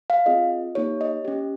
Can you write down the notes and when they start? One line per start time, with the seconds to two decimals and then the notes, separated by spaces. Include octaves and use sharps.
0.10 F5
0.26 C4 F4 G#4 D#5
0.75 A#3 D#4 G4 C#5
1.01 D#5
1.25 C#4 G4